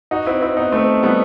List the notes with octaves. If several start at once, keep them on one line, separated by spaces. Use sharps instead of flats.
D#4 F#4
C4 E4
C4 E4
B3 D#4
A3 C4
G3 B3